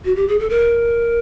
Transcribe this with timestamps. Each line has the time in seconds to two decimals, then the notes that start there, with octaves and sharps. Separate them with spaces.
0.05 F#4
0.16 G4
0.28 G#4
0.39 A4
0.50 A#4